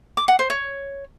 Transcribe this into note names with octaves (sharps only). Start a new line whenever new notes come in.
D6
F#5
C5
C#5